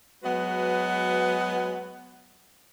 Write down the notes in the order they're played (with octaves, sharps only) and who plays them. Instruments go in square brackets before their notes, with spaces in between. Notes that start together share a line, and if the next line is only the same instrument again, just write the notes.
[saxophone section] F#3 G#3 B3 F#4 B4